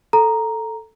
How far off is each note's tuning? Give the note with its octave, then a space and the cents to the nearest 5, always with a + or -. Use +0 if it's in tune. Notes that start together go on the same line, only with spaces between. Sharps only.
A4 +0 A#5 +0